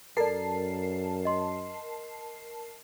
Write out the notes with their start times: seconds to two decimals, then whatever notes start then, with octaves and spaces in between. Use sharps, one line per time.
0.17 F#2 A4 A#4 D5 A5 C7
1.25 D#5 C6